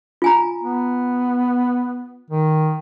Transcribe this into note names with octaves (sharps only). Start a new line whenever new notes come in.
F4 G#5 A#5
B3
D#3